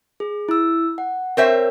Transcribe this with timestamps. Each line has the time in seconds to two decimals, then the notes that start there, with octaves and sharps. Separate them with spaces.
0.20 G#4
0.49 E4 E6
0.98 F#5
1.37 C4 A#4 C5 C#5 E5